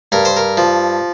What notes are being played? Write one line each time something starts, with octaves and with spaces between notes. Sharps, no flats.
G2 A#4
C5
A#4
F3